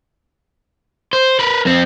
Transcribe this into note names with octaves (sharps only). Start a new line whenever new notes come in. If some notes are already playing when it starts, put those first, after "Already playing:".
C5
A#4 B4
F2 C4